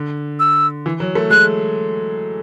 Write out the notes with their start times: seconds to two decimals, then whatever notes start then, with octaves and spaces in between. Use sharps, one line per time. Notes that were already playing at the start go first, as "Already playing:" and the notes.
Already playing: D3
0.40 E6
0.86 E3
1.00 F#3
1.15 A3
1.30 G#3 F#6